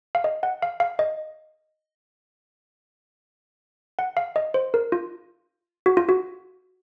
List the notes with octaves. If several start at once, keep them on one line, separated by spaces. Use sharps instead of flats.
F5
D#5
F#5
F5
F5
D#5
F#5
F5
D#5
C5
A#4
F4
F#4
F4
F#4